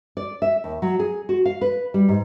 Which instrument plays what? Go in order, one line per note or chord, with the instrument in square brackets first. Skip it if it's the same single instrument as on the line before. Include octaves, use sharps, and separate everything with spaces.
[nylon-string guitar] D5
E5
D#2
F#3
G#4
F#4
F5
B4
G3
G#2